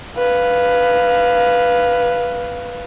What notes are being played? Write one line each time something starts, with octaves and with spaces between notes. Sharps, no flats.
B4 F5